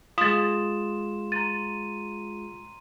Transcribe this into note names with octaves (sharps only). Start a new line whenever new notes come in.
G#3 F4 C6 D#6 A6 E7
A#5 C6 A6 D#7